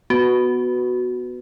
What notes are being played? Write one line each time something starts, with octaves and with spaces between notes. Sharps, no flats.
B3 F#4